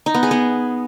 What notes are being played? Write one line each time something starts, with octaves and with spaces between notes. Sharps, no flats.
D#4
B3
G#4
B3